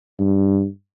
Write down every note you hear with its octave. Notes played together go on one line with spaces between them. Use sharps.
G2